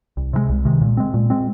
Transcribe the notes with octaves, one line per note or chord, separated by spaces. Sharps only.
C2
C3 D#3 G#3
C2
C3 D#3 G#3
A#2
G#3 C4
A#2
G#3 C4